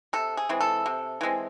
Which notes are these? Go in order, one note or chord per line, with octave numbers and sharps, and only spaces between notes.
C3 A4
G#4
E3 G#3 C4
A4
C3
E3 G#3 C4